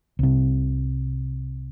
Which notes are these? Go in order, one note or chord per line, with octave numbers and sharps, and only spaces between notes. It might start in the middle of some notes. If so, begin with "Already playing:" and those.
C2 C3